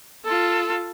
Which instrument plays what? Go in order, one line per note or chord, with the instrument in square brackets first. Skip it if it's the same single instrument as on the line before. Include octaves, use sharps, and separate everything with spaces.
[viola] F4 A4